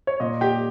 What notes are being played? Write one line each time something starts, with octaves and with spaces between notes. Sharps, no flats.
C#5
A#2 D#5
G4 G5